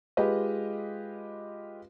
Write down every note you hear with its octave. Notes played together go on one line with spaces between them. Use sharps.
G#3 F4 G4 B4 D#5